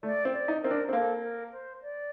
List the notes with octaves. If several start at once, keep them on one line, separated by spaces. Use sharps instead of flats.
A3 D5
C4
D5
D#4
C4 A#4
D4
C4
A#3 A4 C5
A#4
C5
D5